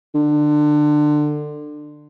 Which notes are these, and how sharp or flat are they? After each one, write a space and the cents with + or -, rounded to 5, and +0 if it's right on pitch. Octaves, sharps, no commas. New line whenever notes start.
D3 +25